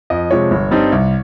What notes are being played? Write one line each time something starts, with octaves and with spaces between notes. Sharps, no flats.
F2 D#5
C3 F3 G#3 C#5
G1
G2 G3 C4 D#4
C2